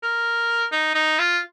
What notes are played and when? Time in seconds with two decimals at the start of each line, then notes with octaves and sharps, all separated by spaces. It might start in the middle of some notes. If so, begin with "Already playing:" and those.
0.03 A#4
0.72 D#4
0.95 D#4
1.19 F4